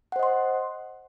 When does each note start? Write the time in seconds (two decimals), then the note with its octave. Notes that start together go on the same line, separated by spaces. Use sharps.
0.12 F#5
0.16 C5
0.19 D#5
0.23 C6